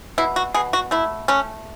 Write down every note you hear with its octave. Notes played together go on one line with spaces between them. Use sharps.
B2 E4
F#4
B2 G#4
F#4
A3 E4
A3 C#4